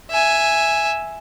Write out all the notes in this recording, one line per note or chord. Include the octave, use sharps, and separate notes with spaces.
E5 G#5